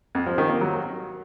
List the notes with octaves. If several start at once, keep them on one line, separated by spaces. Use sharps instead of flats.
F2
F3
D#3
A#3
F#3